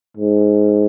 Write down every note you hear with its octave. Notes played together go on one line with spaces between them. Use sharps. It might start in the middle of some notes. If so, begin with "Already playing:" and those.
G#2